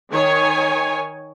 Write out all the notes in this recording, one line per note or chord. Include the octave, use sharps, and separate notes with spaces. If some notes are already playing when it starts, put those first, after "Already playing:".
D#3 C#5 G#5